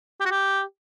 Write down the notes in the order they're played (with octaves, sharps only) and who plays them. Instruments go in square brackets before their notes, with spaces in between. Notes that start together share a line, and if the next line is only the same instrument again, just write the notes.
[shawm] G4
F#4
G4